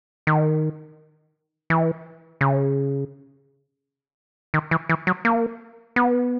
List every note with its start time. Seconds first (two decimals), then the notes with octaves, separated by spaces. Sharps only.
0.27 D#3
1.70 E3
2.41 C#3
4.54 D#3
4.71 E3
4.89 E3
5.07 F#3
5.25 A#3
5.96 B3